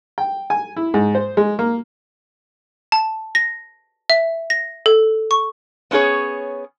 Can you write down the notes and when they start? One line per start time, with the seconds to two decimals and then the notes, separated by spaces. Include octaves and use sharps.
0.18 G5
0.50 G#5
0.76 E4
0.94 G#2
1.15 C5
1.37 G#3
1.59 A#3
2.92 A5
3.35 A#6
4.10 E5
4.50 A#6
4.86 A4
5.31 C#6
5.91 B3 C#4 F4 G#4 C#5